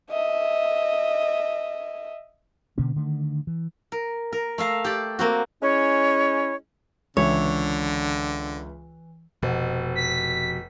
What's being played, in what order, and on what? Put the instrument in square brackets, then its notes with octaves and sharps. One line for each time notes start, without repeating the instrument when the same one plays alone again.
[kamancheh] D#5 E5
[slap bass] B2 D3 A#3 C#4
D3 D#3 A3
E3
[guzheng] A#4
A#4
A3 E5 F5 A#5
G4 D5
A#3 C4 F#4
[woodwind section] G#3 C#4 E4 C#5
[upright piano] C#2 E5 [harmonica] D3 [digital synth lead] E3 [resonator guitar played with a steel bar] C#5
[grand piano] F1 [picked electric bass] B2 F3
[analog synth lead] B6